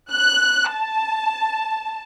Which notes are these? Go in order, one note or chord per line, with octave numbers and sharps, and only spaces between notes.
F#6
A5